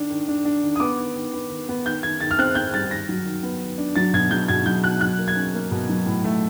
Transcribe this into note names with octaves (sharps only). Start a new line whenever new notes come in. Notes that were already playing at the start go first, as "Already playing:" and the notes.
Already playing: D#3 D4
D#3
D4
D4
D#3
D#6
B3 D6
D#3
D#3
B3
D#3
B3
D#3 G6
D#3 G#6
D#3 A6
F6
C4 F#6
C4 G6
G3 A6
D#3 A#6
F#3
D#3
B3
D#3
D4
F#3 A6
B2 G#6
F#3 G6
B2 G#6
F#3 G6
B2 F#6
F#3 F#6
A#3
G#6
C#4
A#3
B2
F#3
A2
A3